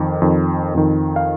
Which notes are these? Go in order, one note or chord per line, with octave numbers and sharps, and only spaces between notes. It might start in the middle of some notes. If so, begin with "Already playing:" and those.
Already playing: F2 D#3
F2 D#3
F2 D#3
F5